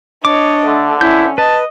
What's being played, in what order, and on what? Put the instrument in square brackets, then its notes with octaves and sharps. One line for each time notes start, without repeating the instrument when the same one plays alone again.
[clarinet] D4 [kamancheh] C#5 D#5 [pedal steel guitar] D6
[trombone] D3 [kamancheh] A3
[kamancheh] C#4 E5 [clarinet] E4 [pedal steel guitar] G6
[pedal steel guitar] B4 [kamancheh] D#5 [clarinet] A5